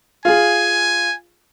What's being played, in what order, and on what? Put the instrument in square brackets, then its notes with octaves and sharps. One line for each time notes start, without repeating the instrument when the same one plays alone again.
[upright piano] F4 G#4 [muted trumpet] G#5